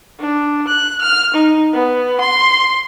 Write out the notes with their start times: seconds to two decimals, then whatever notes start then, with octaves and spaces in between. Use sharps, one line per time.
0.20 D4
0.68 F#6
1.02 F6
1.34 D#4
1.74 B3
2.21 C6